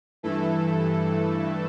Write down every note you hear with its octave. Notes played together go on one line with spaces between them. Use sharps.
G2 E3 A3 E4 A4